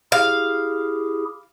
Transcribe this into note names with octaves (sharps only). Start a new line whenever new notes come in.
E4 G4 G#4 F5